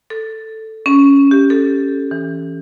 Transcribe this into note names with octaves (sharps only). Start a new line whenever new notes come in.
A4
C#4
G4
A4
E3